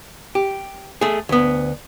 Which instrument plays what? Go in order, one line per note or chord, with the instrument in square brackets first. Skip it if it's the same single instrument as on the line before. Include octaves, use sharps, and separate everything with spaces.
[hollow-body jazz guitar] G4
A3 G#4
D2 B3